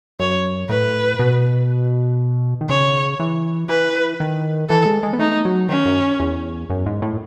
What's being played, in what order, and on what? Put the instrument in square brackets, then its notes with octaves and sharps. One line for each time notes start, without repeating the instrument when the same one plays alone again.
[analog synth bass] F#2 [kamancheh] C#5
[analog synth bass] A2 [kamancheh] B4
[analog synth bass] B2
D#3
[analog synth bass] C#3 [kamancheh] C#5
[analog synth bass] E3
[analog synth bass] E3 [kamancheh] B4
[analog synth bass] D#3
[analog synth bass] E3 [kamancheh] A4
[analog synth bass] G#3
G#3
B3
[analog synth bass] A3 [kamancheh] D#4
[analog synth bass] F#3
[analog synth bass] D#3 [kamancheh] C#4
[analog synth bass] F#2
E2
F#2
G#2
A2